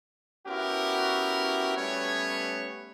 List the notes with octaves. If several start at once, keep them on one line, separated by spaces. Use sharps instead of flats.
B3 C#4 E4 F#4 G4 A#4
G3 A3 B3 C#4 C#5